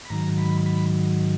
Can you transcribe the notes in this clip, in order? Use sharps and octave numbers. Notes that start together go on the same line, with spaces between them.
B5
G#2 D#3 F#3 A#5
B5
B5